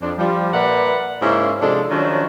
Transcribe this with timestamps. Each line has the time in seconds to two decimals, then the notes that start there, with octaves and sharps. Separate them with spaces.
0.01 F2 D4
0.18 F3 G3
0.53 A#2 A#4 B4 D5 E5 F#5
1.22 G#2 C#3 A#3 C#4 E4
1.61 C3 F3 G#3 D4 A4
1.90 D#3 F3 F#3 C#4 D4